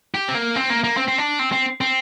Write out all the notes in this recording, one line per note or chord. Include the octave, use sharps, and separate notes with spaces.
G4
C4
A#3
C4
A#3
A#3
C4
C4
D4
C4
C4
C4